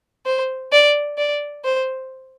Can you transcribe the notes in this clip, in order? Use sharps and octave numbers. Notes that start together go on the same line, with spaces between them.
C5
D5
D5
C5